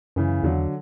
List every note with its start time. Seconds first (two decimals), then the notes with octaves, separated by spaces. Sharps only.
0.16 F#2 C#3 E3
0.43 E2 D3 F#3